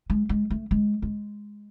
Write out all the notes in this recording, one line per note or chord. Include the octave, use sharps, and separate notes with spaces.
G#3
G#3
A3
G#3
G#3